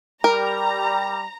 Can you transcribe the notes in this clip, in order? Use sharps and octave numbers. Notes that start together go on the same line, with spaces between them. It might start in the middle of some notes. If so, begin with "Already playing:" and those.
G3 A#4 A#5